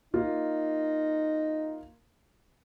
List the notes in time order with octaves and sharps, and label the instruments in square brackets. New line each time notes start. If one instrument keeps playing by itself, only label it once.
[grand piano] A#3 F4 [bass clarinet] D#4